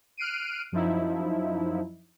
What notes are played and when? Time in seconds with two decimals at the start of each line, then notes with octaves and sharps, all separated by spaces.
0.17 F6 F#6 C7 D7 D#7
0.72 F#2 F3 F#3 D#4 E4